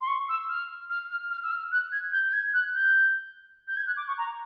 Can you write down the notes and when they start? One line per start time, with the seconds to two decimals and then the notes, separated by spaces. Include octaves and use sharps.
0.01 C6
0.07 C#6
0.29 E6
0.49 F6
0.90 F6
1.10 F6
1.31 F6
1.43 E6
1.51 F6
1.72 F#6
1.92 G#6
2.12 G6
2.29 G6
2.33 G#6
2.53 F#6
2.74 G6
3.68 G6
3.77 G#6
3.87 F#6
3.97 D6
4.08 C#6
4.18 A#5